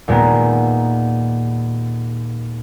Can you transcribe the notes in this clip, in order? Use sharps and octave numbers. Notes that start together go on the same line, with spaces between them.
D#2 A#2 G#3 A#3 B3